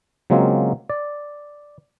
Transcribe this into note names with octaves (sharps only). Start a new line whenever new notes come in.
C#3 F#3 G#3 A#3 C4 F4
D5